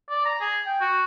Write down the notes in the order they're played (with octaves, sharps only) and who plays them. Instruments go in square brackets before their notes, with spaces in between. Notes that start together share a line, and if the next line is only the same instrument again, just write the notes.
[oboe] D5
A#5
G#4
G5
F#4